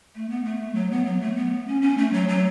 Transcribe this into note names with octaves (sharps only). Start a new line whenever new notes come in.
A3
B3
A3
F#3
B3
F#3
A3
B3
C#4
C#4
A3
F#3
F#3